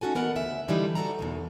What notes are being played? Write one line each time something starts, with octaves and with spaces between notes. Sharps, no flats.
C#4 D#4 F#4 A4 G#5
E3 B3 A#4 D#5 F#5
D2 C#3 E5
D3 E3 F3 G3 A3 D#4
G#2 F#4 A4 D5 A#5
E2 B2 D#3